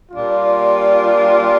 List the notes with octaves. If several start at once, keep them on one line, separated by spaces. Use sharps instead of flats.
A#2 G3 D4 F4